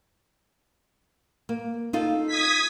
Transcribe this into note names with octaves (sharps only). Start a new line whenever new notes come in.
A#3
D#4 F4 A4
D#6 G#6 B6